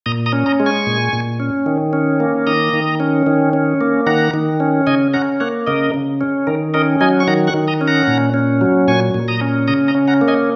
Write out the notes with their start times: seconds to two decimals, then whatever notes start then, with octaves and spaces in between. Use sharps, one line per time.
0.06 A#2 A#5 D#6
0.26 A#5 D#6
0.33 C#4
0.46 A#5 D#6
0.60 G#3
0.66 G#5 C#6
0.87 A#2
1.13 A#2
1.40 C#4
1.66 D#3
1.93 C#4
2.20 A#3
2.47 D#3 A#5 D#6
2.73 D#3
3.00 C#4
3.27 D#3
3.53 C#4
3.81 A#3
4.07 D#3 F#5 A#5
4.34 D#3
4.60 C#4
4.87 C#3 D#5 G#5
5.14 C#4 F#5 A#5
5.40 A#3 C#5 F#5
5.67 C#3 A#4 D#5
5.94 C#3
6.21 C#4
6.47 D#3 A#4
6.74 C#4 A#4 D#5
7.01 F#3 D#5 G#5
7.20 C#6
7.27 D#3 F#5 A#5
7.47 C#6 F#6
7.54 D#3
7.68 A#5 D#6
7.81 C#4
7.88 F#5 A#5
8.08 A#2
8.34 C#4
8.61 F#3
8.88 A#2 G#5 C#6
9.14 A#2
9.28 A#5 D#6
9.41 C#4
9.68 C#3 A#5 D#6
9.88 A#5 D#6
9.95 C#4
10.08 F#5 A#5
10.21 A#3
10.28 D#5 G#5